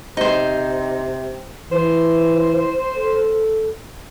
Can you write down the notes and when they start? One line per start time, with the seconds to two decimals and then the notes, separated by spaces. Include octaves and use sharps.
0.17 C3 D#4 C5
1.72 E3 C5
2.96 A4